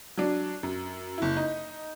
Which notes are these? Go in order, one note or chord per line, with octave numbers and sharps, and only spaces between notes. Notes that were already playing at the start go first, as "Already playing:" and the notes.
F#3 D4
F#2
F#1 E4
D#4